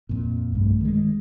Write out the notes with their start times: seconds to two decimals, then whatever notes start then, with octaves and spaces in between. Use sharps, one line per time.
0.09 F2 A#2
0.53 B1 G2 A3
0.81 D#3 G#3